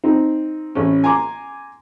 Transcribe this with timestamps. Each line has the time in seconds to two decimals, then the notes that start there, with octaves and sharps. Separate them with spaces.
0.04 C4 D#4
0.75 A1 C#4
1.04 G#5 A#5 C6 D6